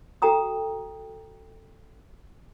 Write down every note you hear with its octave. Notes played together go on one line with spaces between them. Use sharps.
F#4 A4 G5 A#5 D#6